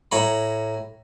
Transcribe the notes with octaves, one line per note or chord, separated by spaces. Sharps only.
A2 C#5 A#5 B5